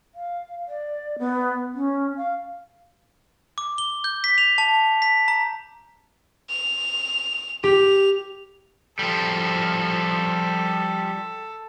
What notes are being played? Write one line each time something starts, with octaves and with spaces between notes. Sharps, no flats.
F5
D5
B3
C#4
F5
D6
G7
G6
B6
F7
A5
B6
A#5
F7
G4 F7
F3 G3 A4